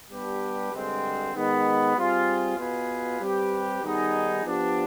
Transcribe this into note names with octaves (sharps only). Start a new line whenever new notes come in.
G3 B3 D4 G4 B4
G2 D3 G#3 C4
D#3 G#3 B3
G3 C4 F4 G#4
B2 B3 F4 G#4 B4
G3 C4 G4 B4
D#3 G3 B3 D#4 G#4
F3 B3 D4 G4